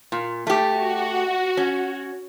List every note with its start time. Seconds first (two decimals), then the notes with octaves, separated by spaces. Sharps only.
0.12 A#2
0.47 A3 G4
0.76 F#4
1.57 C#4